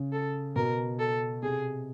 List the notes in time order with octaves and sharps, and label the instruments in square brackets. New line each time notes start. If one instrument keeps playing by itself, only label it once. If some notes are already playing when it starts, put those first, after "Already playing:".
Already playing: [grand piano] C#3
[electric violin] A4
[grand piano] B2 [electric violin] A#4
[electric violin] A4
[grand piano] C3 [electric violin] G#4